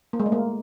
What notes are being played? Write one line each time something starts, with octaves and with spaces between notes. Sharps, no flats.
A#3
G#3
A3
A#3